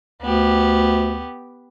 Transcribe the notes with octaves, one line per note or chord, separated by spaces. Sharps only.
D2 B3 G4